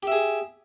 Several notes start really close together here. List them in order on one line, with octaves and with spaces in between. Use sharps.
G4 E5 G#4